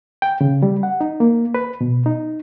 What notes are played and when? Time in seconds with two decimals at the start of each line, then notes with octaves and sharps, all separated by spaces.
0.22 G5
0.41 C#3
0.63 G3
0.83 F#5
1.01 D#4
1.20 A#3
1.54 B4
1.81 B2
2.06 D#4